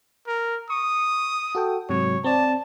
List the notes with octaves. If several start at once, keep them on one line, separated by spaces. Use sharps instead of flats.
A#4
C#6 D#6
F#4 A4 G5
G#2 C3 F#3 C#5
C4 D5 A5